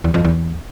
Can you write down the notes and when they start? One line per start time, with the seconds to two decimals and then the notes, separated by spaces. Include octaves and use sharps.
0.04 E2
0.14 F2
0.25 E2